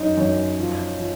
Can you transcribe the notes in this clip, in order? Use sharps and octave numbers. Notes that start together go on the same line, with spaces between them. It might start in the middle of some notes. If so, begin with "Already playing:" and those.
Already playing: F#2 D#4
F#2
F3
F3